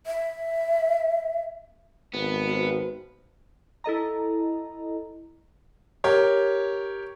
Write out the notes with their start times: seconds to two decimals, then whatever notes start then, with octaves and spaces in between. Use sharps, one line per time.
0.07 E5
2.14 G#1 B3
2.48 F#4 B4 C5
3.84 E4 A4 D#5 A#5
6.04 G4 A#4 C#5